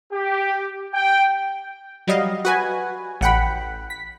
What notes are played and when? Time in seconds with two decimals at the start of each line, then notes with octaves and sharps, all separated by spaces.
0.12 G4
0.94 G5
2.07 F#3 G3 D#5 F5
2.45 F#4 B4 G#5
3.21 A1 F#5 G5 B5
3.90 B6